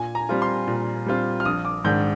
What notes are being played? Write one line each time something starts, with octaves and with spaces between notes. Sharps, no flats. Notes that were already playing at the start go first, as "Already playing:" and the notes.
Already playing: A#2 G#5
A#5
G3 C4 F4
C6
A#2
G3 C4 F4
F6
A#1 D#6
D6
G#2 D#3 G#3 D4 G6